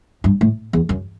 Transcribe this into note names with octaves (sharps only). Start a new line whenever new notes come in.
G2
A2
E2
F#2